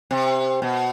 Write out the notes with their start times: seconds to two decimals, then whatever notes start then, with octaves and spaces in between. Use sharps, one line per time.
0.11 C3
0.62 B2